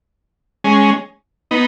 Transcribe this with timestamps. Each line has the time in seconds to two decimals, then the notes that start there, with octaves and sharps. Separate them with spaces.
0.64 G#3 C#4
1.51 B3 D#4